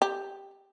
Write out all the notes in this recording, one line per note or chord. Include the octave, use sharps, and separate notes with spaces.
G4